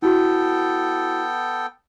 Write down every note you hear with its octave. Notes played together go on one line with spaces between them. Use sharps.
B3 E4 F#4 A4 G5